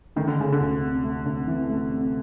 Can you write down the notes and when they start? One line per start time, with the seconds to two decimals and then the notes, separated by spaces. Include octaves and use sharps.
0.16 D#3 A3
0.27 D3
0.38 C#3 A3
0.52 D3
0.60 D2
0.82 C3
1.04 A3
1.26 D2
1.47 E3
1.70 A3
1.91 C3